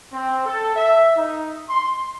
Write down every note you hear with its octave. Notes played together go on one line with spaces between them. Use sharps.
C4
A4
E5
D#4
C6